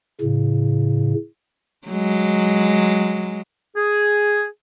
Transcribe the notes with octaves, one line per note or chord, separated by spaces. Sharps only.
A2 C#3
F#3 G#3
G#4